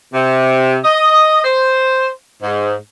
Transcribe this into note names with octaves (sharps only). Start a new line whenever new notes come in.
C3
D#5
C5
G#2